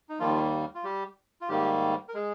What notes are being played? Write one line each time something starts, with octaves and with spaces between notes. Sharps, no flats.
D#4
D#2 D#3 F3 G3 A#3 F4
F4
G3 G4
F4
G#2 D#3 G3 A#3 G4
A#4
G#3 G#4